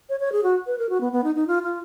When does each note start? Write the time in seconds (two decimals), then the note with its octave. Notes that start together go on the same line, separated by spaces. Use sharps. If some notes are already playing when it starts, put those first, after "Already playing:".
0.09 C#5
0.20 C#5
0.32 G#4
0.44 F#4
0.67 B4
0.78 A#4
0.90 F#4
1.01 B3
1.12 B3
1.24 D#4
1.35 D#4
1.47 F4
1.63 F4